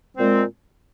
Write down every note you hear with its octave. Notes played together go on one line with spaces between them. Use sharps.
A#2 G#3 C4